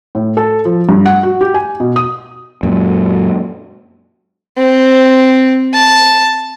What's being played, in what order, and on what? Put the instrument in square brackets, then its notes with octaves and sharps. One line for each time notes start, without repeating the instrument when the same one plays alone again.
[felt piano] A2
A4
F3
G2
F#5
F#4
G4
G#5
B2
D#6
[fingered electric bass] F#2 A#2
[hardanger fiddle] C4
A5